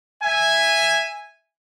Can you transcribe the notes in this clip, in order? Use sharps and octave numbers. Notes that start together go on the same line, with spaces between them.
E5 G#5